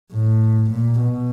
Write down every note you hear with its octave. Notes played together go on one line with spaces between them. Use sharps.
A2
A#2
B2